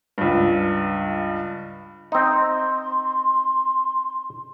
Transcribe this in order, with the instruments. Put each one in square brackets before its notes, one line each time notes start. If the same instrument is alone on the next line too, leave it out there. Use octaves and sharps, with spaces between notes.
[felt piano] C#2 G2
[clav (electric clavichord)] C4 D#4 [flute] C6